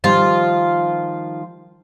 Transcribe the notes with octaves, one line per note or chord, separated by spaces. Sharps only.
D#3 F3 G3 F4